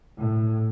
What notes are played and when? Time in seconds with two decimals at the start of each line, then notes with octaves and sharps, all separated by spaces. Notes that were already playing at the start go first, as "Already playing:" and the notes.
0.21 A2